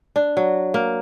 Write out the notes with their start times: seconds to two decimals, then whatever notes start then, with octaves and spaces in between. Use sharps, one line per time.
0.16 D4
0.37 F#3
0.74 A#3